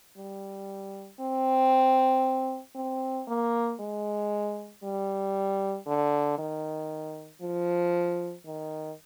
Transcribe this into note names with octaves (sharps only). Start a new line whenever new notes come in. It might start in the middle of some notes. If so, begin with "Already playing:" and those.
G3
C4
C4
A#3
G#3
G3
D3
D#3
F3
D#3